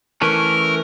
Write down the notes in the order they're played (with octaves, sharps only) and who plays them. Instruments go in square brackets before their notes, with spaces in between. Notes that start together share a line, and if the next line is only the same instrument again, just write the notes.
[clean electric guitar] E3 A3 C#4 [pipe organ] A#4